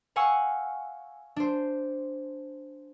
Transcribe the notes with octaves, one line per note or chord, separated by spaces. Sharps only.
F5 F#5 G#5 C#6 E6
D4 C5